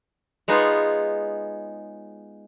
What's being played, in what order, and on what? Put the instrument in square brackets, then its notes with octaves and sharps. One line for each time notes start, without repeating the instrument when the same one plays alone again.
[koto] G#3 B3 D#4 F4 G#4 C#5